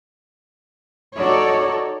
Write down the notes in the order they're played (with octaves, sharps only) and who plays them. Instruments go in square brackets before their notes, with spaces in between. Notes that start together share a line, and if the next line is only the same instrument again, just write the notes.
[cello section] D#4 F#4 A4 C#5 D5